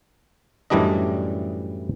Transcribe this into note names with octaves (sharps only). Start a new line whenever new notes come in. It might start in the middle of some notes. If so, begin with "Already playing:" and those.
F#2 A2 E3 G3 D4 D#5